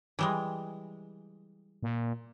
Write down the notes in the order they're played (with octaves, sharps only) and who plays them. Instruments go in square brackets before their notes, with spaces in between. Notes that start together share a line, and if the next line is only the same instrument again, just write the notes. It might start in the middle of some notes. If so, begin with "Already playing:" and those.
[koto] E3 G3 G#3
[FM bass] A#2